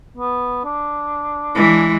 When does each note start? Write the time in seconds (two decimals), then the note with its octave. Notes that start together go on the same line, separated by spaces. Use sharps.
0.17 B3
0.65 D4
1.55 E3 G#3